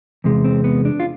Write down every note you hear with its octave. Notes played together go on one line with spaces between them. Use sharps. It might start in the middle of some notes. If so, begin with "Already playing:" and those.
E2 C3 G#3
C4
B3
D4
F4